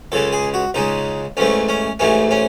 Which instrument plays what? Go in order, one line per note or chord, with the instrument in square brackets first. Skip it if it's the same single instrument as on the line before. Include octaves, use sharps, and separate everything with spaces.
[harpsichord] C#2 C#3 G#3 A4
G#4
F#4
C#2 C#3 G#3 D#4
A1 G#2 E3 A3 C#4
C#4
A1 G#2 E3 A3 C#4
C#4